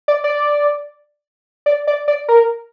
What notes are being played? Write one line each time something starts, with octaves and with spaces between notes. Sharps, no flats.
D5
D5
D5
D5
D5
A#4